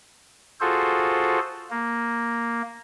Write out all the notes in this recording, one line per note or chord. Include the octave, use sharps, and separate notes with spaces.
F4 F#4 G#4 A4 C5
A#3